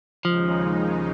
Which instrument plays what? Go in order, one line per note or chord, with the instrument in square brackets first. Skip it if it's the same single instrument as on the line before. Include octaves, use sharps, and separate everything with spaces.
[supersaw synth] D#2 C#3 G#3 D#4 [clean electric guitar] F3